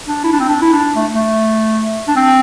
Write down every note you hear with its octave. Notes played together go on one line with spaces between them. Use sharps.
D4
E4
D4
C4
D4
E4
D4
A3
A3
D4
C4